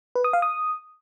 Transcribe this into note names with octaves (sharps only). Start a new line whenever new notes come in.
B4
D#6
F5
D#6